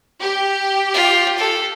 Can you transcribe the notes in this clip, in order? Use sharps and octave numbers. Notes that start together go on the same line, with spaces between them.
G4
F4
A4